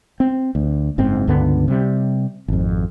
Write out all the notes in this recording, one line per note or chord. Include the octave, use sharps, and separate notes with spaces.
C4
D2
F#1 G#2 C4
C#2 G2 D3 B3
C3 G3
G#1 F2